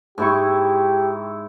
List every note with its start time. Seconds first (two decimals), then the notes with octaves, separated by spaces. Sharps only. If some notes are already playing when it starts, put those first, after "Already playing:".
0.18 G#2 E4 G4 C#6